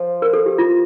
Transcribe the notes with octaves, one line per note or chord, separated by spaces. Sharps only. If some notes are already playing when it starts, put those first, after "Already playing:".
Already playing: F3
A#4
A4
G4
F4